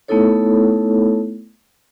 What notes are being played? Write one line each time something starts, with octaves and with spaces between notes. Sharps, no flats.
A3 B3 D#4 E4 A4 C#5